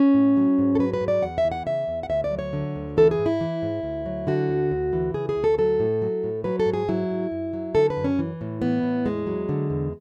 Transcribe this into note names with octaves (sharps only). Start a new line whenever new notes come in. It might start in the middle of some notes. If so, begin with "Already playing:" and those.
Already playing: C#4
A2
F#3
G#2
A4
F#3 B4
B4
G#2
D5
E2 F#5
E5
E3
F#5
C#3 E5
E2
F#5
D2 E5
D5
F#3
C#5
D3
D2
E3 A4
G#4
G#2
E4
E3
G#2
D2
F#3
D3 F#4
D2
D2
E3
C#3 G#4
G#4
D2
A4
F#3 A4
A2
F#3
A2
F#3 B4
A4
G#2
G#4
F#3 E4
G#2
F#2
F#3
D3 A4
B4
F#2
C#4
E3
A2
E3 B3
A2
E2 G#3
F#3
D3
E2